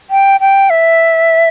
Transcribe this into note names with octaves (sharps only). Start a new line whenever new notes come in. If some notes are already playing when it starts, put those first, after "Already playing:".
G5
G5
E5